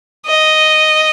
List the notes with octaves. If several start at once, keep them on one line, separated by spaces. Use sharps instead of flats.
D#5